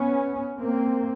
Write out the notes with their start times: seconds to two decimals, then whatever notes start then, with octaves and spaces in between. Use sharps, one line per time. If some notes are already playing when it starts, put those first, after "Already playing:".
Already playing: B3 C#4
0.59 A#3 C4